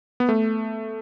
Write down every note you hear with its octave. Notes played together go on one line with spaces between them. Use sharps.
B3
A3